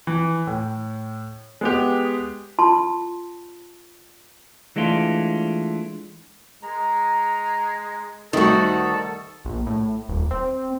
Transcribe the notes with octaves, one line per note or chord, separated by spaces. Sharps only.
E3
A2
G#3 B3 G4
F4 A5 C6
E3 G#3 A3 D4 F4
G#3 A#5
D2 D#3 G3 A3 D#4 F#4 A4
A#1
A2
D#1
C4